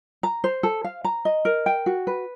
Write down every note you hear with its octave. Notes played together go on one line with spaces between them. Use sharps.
A#5
C5
A4
F5
A#5
D#5
A#4
G5
F#4
B4